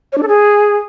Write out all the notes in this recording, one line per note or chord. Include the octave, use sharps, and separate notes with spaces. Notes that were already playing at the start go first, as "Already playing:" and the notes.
C#5
D4
A4
G#4